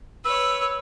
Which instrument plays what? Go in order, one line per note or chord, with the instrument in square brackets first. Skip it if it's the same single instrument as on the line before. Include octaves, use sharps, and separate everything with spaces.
[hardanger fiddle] B4 C#5 [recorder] E6